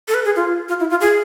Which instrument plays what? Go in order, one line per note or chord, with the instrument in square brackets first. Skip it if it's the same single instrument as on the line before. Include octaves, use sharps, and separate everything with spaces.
[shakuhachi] A4
B4
G#4
F4
F4
E4
F4
G#4